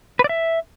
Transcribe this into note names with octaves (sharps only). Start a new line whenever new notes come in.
B4
D5
E5